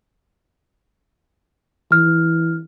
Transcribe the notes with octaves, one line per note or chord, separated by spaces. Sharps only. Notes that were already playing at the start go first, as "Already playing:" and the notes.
E3 F6